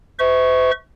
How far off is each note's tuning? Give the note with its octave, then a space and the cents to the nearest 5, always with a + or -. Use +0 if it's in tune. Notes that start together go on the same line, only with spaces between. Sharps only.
C5 -45 E5 -35 C#6 +0